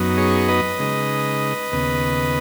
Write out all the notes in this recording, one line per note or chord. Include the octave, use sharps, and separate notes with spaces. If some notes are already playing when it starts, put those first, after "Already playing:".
Already playing: F#2 F#3 B3 D#4
G#4 C#5
B4 D#5
C#3 G#3 D#4
D#2 C#3 B3